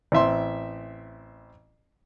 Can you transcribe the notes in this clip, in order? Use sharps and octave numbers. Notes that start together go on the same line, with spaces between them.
A1 C4 E5 C6